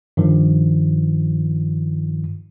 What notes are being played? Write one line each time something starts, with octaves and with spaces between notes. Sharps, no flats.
G2 D#3 F3